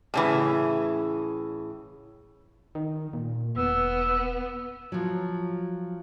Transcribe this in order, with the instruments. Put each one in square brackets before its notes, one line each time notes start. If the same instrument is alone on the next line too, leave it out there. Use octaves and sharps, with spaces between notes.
[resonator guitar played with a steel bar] A2 C#3 E3
[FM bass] D#3
A#2
[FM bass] E1 [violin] B3 [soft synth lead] E6
[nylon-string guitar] F3 F#3